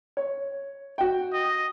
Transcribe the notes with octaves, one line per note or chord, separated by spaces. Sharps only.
C#5
F#4 G5
D#5